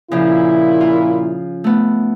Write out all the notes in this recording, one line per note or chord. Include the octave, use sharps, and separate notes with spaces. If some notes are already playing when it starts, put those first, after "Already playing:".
A#2 C#3 F3 E4
F4
A3 B3